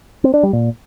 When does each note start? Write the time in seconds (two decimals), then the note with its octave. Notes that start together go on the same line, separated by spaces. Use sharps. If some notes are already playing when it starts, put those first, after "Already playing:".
0.24 C4
0.34 D4
0.43 G3
0.53 A#2